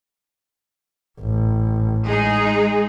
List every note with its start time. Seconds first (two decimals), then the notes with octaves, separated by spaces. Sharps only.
1.21 A1
2.04 G#3 D#4 G#4